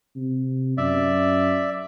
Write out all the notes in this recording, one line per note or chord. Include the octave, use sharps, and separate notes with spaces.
C3
F#2 D5 E5